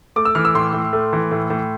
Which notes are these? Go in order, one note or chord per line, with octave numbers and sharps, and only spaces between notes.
A3 D6
E6
E3 F6
E6
A2 C6
A2
A3
E3
A2
A2